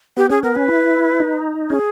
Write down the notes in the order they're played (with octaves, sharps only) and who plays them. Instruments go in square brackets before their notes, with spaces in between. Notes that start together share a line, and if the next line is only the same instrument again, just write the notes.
[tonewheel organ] B3 [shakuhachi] G4
[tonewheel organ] C#4 [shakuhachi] G#4
[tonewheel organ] B3 [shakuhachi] A#4
[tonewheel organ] C#4 [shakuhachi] B4
[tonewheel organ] E4
D#4
[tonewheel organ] C#4 [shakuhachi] G#4